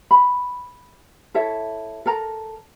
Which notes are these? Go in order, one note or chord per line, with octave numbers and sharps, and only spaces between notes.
B5
E4 A4 C#5 E5
A4 A#4 A#5